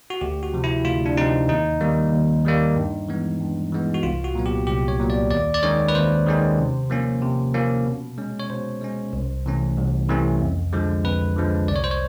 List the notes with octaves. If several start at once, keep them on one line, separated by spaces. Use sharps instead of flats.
F#4
D2 G4
F#4
C3 F3
E4
D2 F4
D4
C3 F3 D#4
D#2 D#4
D#3 G3 A#3
D#2
D#3 G3 A#3
G2
E3 G#3 B3
G2
E3 G#3 B3
F#4
C2 F4
F#4
A#2 F#3 B3
G4
C2 G4
C#5
A#2 F#3 B3
D5
D#2 D5
D5
D#3 G#3 C#4 C#5
B4
D#2 C5
D#3 G#3 C#4
C3
F3 A#3 C#4
C3
F3 A#3 C#4
B2
G#3 C#4
C#5
B2 C5
G#3 C#4
C2
C3 E3 A3 C#4
C2
C3 E3 A3 C#4
F2
D3 F3 G#3
F2 B4
D3 F3 G#3
C2 D5
C#5
C5
C#5